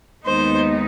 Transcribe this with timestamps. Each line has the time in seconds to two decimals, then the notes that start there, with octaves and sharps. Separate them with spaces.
0.25 D#2 D#3 G#3 B3 D#4 C5